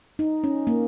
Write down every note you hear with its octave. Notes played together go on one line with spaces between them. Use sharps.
D#4
C#4
A#3